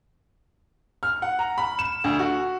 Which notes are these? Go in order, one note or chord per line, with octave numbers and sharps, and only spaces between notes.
F6
F#5
A#5
B5
E7
D2
F#4